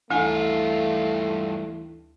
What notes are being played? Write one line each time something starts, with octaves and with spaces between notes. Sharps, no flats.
D2 G2 E3 A3 D#4 F4 G#5